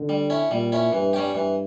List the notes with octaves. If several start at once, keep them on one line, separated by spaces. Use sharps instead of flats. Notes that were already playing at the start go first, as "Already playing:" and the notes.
Already playing: D3
G3
C#4 E4
A#2 G3
C#4 E4
G2 E3
G3 C#4 G4
G2 E3